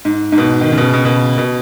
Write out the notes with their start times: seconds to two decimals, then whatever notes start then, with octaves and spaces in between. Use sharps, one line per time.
0.05 G#2
0.32 G#2
0.38 B2
0.61 D#3
0.72 C#3
0.78 B2
0.83 C#3
0.93 B2
1.05 B2
1.38 B2